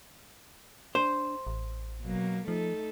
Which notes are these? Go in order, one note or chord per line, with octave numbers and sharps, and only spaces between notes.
D4 C5
A1
B2 F#3 A#3
F3 A3 D#4 A4